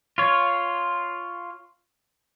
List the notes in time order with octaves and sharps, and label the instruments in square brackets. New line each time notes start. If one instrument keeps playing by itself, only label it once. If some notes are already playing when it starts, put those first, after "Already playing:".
[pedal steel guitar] F4 C#5